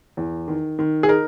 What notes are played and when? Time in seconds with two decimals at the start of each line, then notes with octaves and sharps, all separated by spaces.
0.17 E2
0.48 D#3
0.79 D#3
1.03 G#4
1.08 D#4 A#4